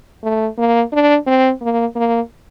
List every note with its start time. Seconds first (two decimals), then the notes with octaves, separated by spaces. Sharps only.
0.24 A3
0.58 A#3
0.93 D4
1.27 C4
1.62 A#3
1.96 A#3